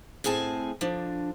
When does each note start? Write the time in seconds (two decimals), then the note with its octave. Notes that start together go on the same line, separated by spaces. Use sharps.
0.24 A2 C4 G#4 G#5 A5
0.81 D3 F3 D4